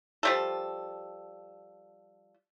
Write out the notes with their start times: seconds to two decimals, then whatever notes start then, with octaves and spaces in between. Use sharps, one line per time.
0.23 F3 G3 A4